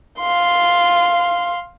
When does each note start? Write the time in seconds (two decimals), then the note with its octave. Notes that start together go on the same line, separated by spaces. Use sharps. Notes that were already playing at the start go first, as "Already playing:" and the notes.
0.20 F5 C6